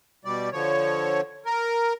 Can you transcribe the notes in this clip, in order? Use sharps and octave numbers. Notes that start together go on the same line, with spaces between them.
B2 G3 D5
D3 F3 C#5
A#4